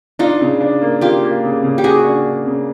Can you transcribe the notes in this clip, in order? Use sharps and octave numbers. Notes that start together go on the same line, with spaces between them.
D4 D#4 F4
C#3
D4
A#3
A#3 F4 G4
A#3
C#3
C#3
G4
C#3 F#4 G#4
D4
D4
C#3